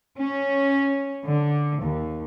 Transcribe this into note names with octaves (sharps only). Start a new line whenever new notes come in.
C#4
D3
D#2